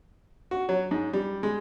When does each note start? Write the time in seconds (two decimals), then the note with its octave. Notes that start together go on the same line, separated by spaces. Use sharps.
0.51 F#4
0.69 F#3
0.91 G#2
1.13 G3
1.43 G#3